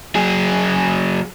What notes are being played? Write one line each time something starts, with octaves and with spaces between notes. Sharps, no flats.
F#3 G#4